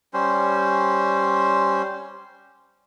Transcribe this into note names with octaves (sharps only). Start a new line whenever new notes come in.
G3 C#4 C5